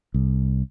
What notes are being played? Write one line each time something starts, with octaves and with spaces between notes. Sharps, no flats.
C2